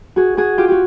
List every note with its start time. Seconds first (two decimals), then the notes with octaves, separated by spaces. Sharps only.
0.16 F#4 G#4
0.37 F#4 G#4
0.58 F4 G4
0.68 F#4 G4